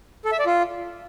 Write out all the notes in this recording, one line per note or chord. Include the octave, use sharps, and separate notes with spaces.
A4
E5
D5
F4